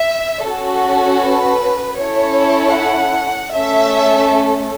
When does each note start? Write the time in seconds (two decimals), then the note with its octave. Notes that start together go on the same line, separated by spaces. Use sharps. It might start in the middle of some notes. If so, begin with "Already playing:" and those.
Already playing: E5
0.46 C#4 F#4 A4
1.23 B4
2.00 C#4 E4 A4 C#5
2.77 F#5
3.53 A3 C#4 A4 E5